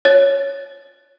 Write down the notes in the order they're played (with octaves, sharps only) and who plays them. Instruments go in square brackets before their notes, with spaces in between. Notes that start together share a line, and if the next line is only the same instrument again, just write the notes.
[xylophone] C#5 A6